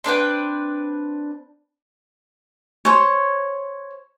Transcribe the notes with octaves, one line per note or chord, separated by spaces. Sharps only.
C4 D4 B4 G5
C5 C#5